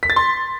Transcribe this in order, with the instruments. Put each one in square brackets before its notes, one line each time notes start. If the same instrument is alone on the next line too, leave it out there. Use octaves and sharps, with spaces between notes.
[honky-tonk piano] B6
A6
C6